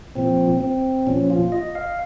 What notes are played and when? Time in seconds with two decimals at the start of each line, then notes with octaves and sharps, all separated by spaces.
0.15 A#2 F3 C4
0.61 C4
1.07 A#2 F3 C#4
1.30 F4
1.52 D#5
1.75 F5